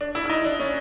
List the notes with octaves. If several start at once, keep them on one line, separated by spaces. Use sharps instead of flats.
D4
E4
E4
D#4
D4
C#4